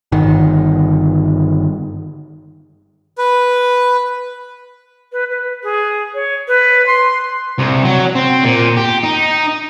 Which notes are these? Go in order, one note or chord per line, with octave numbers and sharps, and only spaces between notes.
G1 D#3
B4
B4
B4
G#4
C#5
B4
C6
C2
F#3
C4
A#2
G4
D#4